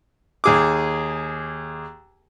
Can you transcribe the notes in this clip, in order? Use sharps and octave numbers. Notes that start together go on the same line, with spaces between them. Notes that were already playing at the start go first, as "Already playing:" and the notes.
D#2 G#4 D6